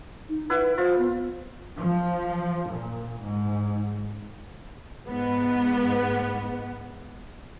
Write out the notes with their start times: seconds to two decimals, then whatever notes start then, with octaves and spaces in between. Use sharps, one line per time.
0.29 D#4
0.50 E4 B4 F#5
0.78 F4 C5
0.98 B3
1.80 F3
2.71 A#2
3.24 G#2
5.07 G#2 B3